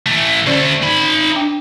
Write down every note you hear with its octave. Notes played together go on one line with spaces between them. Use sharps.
E3 A3
D2 A3 C#4 C5 D5
D#4 B5
D4 G5